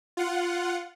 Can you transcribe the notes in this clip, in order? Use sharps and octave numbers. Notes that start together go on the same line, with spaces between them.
F4 F#5